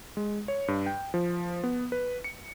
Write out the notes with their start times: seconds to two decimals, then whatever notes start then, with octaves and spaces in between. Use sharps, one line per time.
0.17 G#3
0.48 C#5
0.68 G2
0.86 G5
1.14 F3
1.64 B3
1.92 B4
2.24 C#7